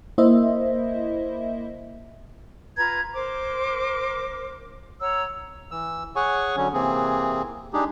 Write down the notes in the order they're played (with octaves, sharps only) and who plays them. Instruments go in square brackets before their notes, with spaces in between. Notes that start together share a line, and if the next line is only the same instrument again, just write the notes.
[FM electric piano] A#3 E4 C5 D#5 E5
[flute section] F4 B4 A#5 G#6
A#4 C5 D6
C#5 F#5 A#5 E6
[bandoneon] E3 E6
G#4 C#5 F#5 G#5 C#6
D3 F#3 C#4
C3 E3 A#3 C4 G#4
G#3 D4 D#4 G4 G#4